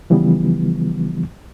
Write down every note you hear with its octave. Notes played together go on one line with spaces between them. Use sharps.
C#3 E3 F3 G3 B3